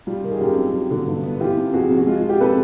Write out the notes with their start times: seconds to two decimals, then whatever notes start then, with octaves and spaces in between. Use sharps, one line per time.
0.07 G3 F4
0.24 D#3
0.31 G#4
0.40 F#2 F4 G4
0.57 C4
0.73 F#3
0.91 D3
1.07 G2
1.24 B3
1.41 E3 F4 G4
1.57 C3
1.73 F2 F#4 G#4
1.90 F2
1.98 F#4
2.07 G#3 F4
2.18 F4
2.24 F3
2.29 F4 G4
2.40 C3 A4 B4